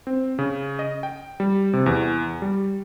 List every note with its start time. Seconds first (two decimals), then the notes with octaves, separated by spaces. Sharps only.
0.07 C4
0.39 C#3
0.79 D#5
1.03 G5
1.40 G3
1.73 C3
1.86 E2
2.42 G3